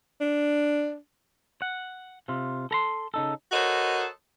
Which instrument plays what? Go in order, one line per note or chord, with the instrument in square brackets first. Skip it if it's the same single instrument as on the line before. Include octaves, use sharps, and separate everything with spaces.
[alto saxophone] D4
[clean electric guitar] F#5
C3 F4
A4 A#5 C6
C#3 D#4 A4
[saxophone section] F#4 A4 A#4 C5 C#5 D#5